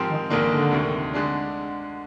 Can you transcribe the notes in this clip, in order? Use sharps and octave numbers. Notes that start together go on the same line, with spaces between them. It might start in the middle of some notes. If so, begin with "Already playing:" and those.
Already playing: G#2 F3 C4 G4 A#4
D#3
A#1 G#2 D3 D#3 A#3 D4
D3
D2 C3 D#3
D3 G#3 D4